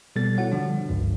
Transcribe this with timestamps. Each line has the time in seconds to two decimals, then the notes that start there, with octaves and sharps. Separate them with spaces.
0.16 B2 G3 B3 A4 A6
0.38 E4 F#4 C#5 F#5
0.52 D3 F3 G3 D4
0.89 G1 C#2 G2